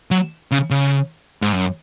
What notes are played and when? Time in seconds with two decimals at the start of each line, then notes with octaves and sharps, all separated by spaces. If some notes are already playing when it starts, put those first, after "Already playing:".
0.11 F#3
0.52 C#3
0.71 C#3
1.42 G#2
1.52 F#2